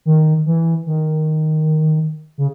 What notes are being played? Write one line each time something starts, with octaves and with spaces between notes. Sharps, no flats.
D#3
E3
D#3
C#3